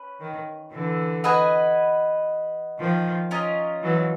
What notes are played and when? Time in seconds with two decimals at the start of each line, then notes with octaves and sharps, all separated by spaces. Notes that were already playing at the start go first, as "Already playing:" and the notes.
Already playing: C#4 B4
0.21 D#3
0.72 D3 E3
1.24 F#4 B4 D#5 G#5
2.79 D#3 F3
3.31 C#4 F4 A#4 D#5
3.83 E3 F#3